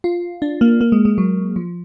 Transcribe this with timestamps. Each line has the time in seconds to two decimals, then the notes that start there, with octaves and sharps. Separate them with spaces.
0.04 F4
0.42 D4
0.61 A#3
0.81 A#3
0.92 G#3
1.05 G#3
1.18 F#3
1.56 F3